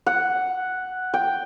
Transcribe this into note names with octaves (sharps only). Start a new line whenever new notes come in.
F#5
G5